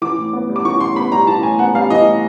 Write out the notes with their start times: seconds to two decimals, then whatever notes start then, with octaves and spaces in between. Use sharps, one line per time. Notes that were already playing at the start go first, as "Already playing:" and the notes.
0.02 E3 D6
0.18 A2
0.33 B3
0.49 G3
0.56 D6
0.65 E3 C#6
0.80 A2 C6
0.96 B3 B5
1.12 G3 A#5
1.27 E3 A5
1.43 A2 G#5
1.59 B3 F#5
1.75 G3 F5
1.90 E3 D#5
2.06 A2